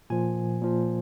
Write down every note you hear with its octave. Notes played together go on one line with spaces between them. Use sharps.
A#2 F3 G#5
A#2 F3